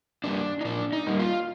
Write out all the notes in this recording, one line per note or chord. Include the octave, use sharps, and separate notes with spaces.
G3 A#3 D4
D#4
A#2 D4
D#4
G3 A#3
F4